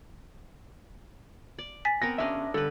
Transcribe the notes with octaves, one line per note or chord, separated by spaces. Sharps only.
D5
G#5 A6 B6
B3 C4 A#4 A#6
C#3 C#4 D4 D#5 E5
G2 D3 A4 B4